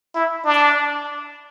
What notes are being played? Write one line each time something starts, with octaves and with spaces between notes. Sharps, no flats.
E4
D4